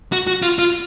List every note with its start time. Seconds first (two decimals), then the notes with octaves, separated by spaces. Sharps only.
0.12 F#4
0.27 F#4
0.43 F4
0.59 F4